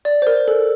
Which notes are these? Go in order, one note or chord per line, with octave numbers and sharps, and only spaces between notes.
D5
C5
A#4
A4